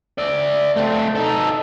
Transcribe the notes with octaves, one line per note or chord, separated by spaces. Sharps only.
D5 E5
A3 C4
D#4 A4